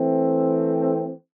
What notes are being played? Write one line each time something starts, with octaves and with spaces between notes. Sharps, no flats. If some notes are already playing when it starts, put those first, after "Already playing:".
Already playing: E3 A3 C4